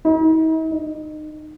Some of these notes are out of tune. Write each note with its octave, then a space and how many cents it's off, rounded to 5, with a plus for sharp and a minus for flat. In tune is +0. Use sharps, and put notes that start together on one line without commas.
D#4 +45
D#4 -25